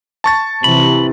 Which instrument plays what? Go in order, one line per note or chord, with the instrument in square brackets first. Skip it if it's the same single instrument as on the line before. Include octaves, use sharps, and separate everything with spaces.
[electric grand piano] A5 C#6 A6
[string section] C3 E3 [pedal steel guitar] B5